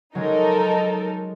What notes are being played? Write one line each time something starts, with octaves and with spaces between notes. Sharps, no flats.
F#3 G#3 C#4 D#4 A4 A#4